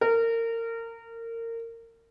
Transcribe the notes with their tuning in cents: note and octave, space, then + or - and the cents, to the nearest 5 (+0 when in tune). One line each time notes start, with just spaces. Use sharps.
A#4 -25